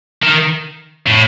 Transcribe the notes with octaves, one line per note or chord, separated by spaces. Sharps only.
D#3
A2